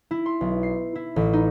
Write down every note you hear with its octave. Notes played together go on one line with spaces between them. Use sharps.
E4
C6
B1
C7
E4
A1
D#4